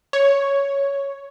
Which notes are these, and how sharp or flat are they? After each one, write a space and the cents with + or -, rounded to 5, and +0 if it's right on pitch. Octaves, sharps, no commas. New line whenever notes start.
C#5 +5